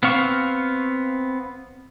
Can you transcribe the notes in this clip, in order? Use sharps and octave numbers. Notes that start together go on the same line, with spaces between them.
B3 C4 F5 C#6